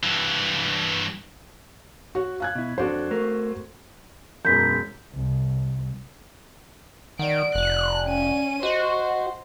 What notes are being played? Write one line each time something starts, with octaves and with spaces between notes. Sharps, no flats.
G2 E3
F#4 C#5
F5 F#6 G#6
B2 E4
F2 C4 D4 F#4 A4 C5
A3 A#4
E1 F#2 G6 B6
C2
D#3 D5 F#5 D7
F1 F#6
C#4 D#7
F#4 C5 D#5